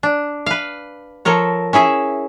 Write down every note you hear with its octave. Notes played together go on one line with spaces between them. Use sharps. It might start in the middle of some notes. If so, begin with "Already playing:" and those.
D4
B4 F5
F3 A4 A#4 C#5
C#4 E4 G#4 E5